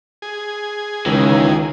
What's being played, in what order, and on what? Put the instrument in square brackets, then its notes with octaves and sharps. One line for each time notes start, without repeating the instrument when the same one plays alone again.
[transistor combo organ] G#4
[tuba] C#2 [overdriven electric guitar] D#3 E3